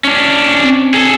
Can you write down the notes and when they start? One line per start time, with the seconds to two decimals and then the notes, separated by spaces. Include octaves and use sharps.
0.04 C#4 D4
0.63 C4
0.94 G#4 A4